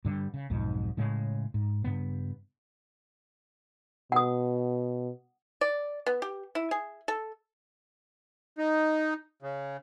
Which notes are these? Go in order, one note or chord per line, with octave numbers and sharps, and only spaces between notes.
G2 D3 F#3 G3
C#3
B1 F2 G#2
A2 C#3 G#3
G#2
G2 C#3 B3
B2 F#5 D#6
D5
B3
G4
E4
G#4
A4
D#4
C#3